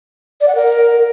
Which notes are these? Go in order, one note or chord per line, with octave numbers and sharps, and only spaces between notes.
D5
F#5
A#4